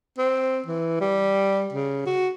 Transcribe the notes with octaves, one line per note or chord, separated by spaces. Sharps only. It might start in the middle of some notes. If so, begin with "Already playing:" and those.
C4
E3
G3
C#3
F#4